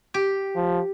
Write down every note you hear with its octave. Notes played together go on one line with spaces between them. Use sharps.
G4
F3